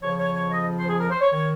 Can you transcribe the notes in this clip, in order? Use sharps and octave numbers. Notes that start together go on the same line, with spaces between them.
F2 C#3 F3 C#5
C#5
C#5
D#5
C5
G#4
A#4
C5
C#5
D#3 C#5